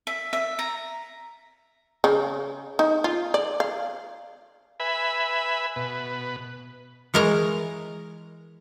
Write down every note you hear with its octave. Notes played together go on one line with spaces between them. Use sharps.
E5
E5
A#5
C#3
D#4
F4
D5
F5
B4 E5 G#5 B5
B2 B4
E3 G#3 A#4 C#5 A#5